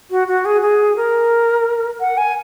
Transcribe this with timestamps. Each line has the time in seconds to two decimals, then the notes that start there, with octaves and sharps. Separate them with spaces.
0.10 F#4
0.27 F#4
0.45 G#4
0.62 G#4
0.96 A#4
2.00 F#5
2.17 G#5